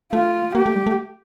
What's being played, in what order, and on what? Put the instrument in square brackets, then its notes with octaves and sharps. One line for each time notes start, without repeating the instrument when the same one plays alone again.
[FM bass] A3 [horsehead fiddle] F4
[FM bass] A#3 [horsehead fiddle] G4
[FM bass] A3
G3
A3